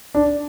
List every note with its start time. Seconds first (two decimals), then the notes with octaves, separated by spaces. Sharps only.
0.15 D4